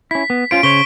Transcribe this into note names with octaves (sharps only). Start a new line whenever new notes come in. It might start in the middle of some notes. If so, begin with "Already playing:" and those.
C#4 E4 B6
B3
C#4 F4 C5 D7
C#3 C5 C#5 C#6 B6 G7